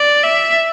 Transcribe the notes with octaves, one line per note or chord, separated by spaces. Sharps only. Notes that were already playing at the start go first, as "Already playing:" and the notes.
Already playing: D5
E5